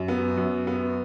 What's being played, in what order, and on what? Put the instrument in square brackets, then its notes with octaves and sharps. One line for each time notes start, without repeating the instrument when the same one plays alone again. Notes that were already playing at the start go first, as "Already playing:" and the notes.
Already playing: [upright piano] F#2
B3
F#2
B3